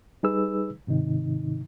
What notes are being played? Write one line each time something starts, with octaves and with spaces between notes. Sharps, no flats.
G3 D#4 G#4 B4 E6
G#2 C3 D#3 D#4